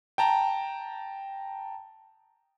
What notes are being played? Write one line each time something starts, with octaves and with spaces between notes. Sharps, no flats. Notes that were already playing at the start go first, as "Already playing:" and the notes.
G5 A5 A#5